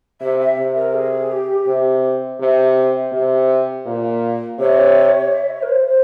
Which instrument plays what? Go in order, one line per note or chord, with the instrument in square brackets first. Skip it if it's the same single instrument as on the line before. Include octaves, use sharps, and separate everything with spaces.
[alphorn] C3 [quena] E5
[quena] E5
[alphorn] C3
[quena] A#4
G#4
G4
[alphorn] C3
C3
C3
A#2
[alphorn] C3 [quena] C#5
[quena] E5
C#5
A#4
C5
C5